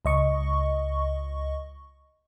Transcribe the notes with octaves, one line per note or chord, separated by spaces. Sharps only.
C#2 D#5 C#6